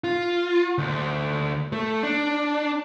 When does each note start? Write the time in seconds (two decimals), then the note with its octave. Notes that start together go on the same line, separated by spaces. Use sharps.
0.04 F4
0.78 D2
1.73 A3
2.03 D4